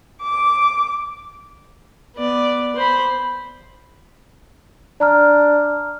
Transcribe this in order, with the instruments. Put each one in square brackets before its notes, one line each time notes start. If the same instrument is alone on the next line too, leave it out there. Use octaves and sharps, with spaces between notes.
[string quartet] D6
[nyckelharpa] B3 D5
C5 B5
[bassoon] D4 [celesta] D5 A#5 F6